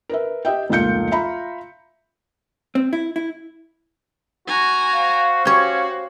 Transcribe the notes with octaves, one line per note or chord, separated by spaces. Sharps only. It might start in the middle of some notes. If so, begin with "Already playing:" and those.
A#4 B4 E5
G4 D#5 E5 G5
F1 C#2 A#2 F4 G6 C#7
F4 E5 A#5 B5
C4
E4
E4
F#4 G#5 A#5
C5 F5
C#4 F#4 G4 C#5